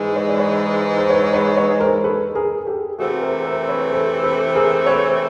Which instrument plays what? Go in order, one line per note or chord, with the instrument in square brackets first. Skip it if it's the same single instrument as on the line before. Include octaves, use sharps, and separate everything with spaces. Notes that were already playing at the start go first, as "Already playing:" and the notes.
Already playing: [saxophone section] G#2 E3 G#3
[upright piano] C#5
D5
B4 C#5
C5
B4 C#5
B4 C#5
B4 C#5
A#4 C5
A4 B4
G#4 A#4
G4 A4
[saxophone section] C3 E3 A3 C4 [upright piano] F#4 G#4
[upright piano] A#4 C5
A#4 C5
B4 C#5
C5
A4 B4
A4 B4
G#4 A#4
B4 C#5